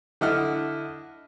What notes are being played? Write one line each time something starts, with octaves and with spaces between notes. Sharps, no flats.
D3 E4 D#5 F#5 F6